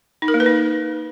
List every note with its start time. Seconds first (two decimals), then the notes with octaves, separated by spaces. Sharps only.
0.22 D#4
0.28 A#4
0.34 A#3
0.40 B4
0.46 D#4